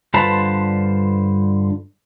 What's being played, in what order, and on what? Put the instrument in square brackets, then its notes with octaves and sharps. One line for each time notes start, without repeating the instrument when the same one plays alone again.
[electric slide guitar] G2 D3 F4 B4 C5 A5